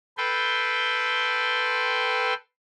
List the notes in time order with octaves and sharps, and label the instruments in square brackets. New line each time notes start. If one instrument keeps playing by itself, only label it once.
[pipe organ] A4 B4 G5 C6